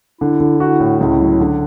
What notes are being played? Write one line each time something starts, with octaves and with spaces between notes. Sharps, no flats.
D3 E4
D3
E4 F#4
A2
C#2 E4
F#3
D3